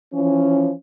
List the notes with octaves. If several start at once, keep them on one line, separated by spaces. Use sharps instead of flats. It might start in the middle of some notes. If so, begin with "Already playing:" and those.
E3 F3 C#4